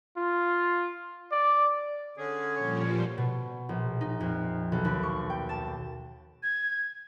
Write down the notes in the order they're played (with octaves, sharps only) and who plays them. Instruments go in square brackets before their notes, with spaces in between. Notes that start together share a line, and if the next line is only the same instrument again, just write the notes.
[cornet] F4
D5
[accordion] D3 C#4 [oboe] G#4
[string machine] A#2 F3 G3 [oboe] C#5
[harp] B2
A#1
D#4
F2
B1
D#2
C#6
G5
A5
[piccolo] G#6